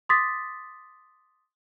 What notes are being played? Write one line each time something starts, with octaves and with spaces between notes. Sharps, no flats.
C6 D6 D#6 A6 B6